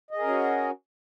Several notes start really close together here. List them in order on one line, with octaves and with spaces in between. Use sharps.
D#5 G#4 A#4 C#4 F#4